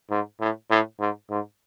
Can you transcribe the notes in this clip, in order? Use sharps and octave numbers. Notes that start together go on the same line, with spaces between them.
G#2
A2
A2
G#2
G#2